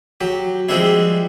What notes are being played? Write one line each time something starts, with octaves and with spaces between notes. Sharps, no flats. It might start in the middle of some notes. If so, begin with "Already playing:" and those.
F#3 G4
F3 G3 G#3 C4 D4 E4